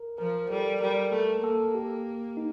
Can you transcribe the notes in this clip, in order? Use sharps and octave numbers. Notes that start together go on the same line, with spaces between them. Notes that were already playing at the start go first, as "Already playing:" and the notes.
Already playing: A#4
F3 A#4
G3 A4
G3 A#4
A3 A4
A#3 A4
G4
D#4